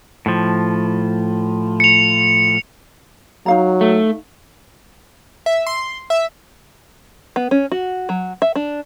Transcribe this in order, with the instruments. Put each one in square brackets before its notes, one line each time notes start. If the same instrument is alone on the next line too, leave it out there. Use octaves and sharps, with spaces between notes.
[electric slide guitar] A2 F3
[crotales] C#7 F7
[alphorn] F#3 [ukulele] D#4 F5 A#5
[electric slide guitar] A3
[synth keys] E5
C6
E5
[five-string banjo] B3
C#4
F#4
F#3
E5
D4